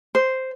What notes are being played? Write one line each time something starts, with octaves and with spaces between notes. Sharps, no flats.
C5